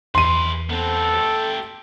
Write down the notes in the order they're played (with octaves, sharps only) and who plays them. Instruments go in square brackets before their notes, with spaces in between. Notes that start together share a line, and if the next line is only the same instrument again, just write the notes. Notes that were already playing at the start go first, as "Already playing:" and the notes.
[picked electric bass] E2 [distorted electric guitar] G#4 B4 [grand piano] C6 D#7
[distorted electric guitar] B3 C4 [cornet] A4
[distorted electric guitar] A3 G4